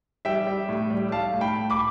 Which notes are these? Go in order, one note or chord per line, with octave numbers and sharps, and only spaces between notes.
G3 E5 G5
G3
A2
G3
G3 F5 A5
A2
G5 B5
A2
B5 D6